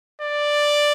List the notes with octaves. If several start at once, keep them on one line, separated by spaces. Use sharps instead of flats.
D5